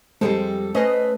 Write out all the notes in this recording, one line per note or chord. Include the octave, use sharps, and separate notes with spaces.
F2 G3 G#3 D#4 G4 A4 C5
A3 C#4 B4 C5 D#5